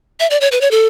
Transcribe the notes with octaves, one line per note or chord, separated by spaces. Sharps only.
E5
D5
C#5
B4
C#5
A4